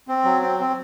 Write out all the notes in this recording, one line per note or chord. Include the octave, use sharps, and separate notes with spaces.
C4
F#3
C4
C4